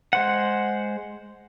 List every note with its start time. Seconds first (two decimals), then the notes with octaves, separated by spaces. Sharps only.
0.13 G#3 C5 F#5